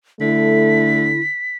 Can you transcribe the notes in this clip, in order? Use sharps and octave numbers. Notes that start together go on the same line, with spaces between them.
D3 A3 E4 B6